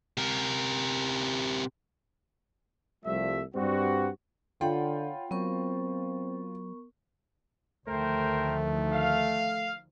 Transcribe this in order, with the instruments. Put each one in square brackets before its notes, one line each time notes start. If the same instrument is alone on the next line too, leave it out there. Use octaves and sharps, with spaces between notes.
[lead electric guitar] C3 A#4
[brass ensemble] C2 F3 G3 A3 E5
G2 G3 C4 F#4
[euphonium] D3 [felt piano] F4 G5 [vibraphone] C#5 F#5 B5
[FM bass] F#3 [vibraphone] B3 A#4 C#6 [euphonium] C4
[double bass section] D2 D#3 F3 [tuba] A3 [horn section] A#4 C5 G5
[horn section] F5